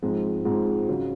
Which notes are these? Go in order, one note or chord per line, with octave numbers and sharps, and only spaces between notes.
G#2 F3 G#3 C4
G#2 F3 G#3 C4
C#3 F#3